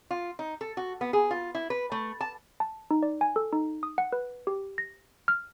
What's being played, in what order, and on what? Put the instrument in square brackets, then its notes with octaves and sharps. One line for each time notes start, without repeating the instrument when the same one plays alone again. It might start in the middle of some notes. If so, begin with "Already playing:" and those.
[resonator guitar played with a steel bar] F4
D#4
A4
F#4
B3
G#4
F4
E4
B4
A3
A5
[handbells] A5
D#4
D5
G#5
A4
D#4
D#6
F#5
B4
G4
A#6
F6